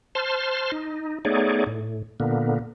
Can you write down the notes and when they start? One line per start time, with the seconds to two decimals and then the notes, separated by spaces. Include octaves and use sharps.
0.15 C5 A5 C6 F6
0.72 D#4
1.25 A3 B3 D#4 G#4 C#5 D5
1.66 A2
2.20 A#2 D3 A#3 B3